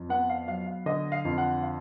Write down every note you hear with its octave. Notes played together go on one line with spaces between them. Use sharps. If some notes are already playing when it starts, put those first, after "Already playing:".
Already playing: F2
B3 F#5
F5
F#3 F5
F5
D3 D#5
F5
F2
F#5
F5